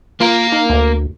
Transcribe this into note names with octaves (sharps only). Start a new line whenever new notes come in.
A#3 F4 A#4
D#4
D2